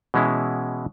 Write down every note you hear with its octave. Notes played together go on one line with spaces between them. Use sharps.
B2 E3 G#3 C#4 E4